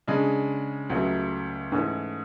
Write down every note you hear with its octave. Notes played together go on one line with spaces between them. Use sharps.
C#3 G#3 D4 G#4
C#2 C#3 F#3 A3
G#2 E3 A3 C#4